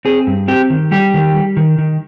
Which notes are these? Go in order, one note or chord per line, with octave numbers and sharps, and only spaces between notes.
C4 G#4
G2
C4 G4
D#3
G3 G4
D#3
G3
D#3
D#3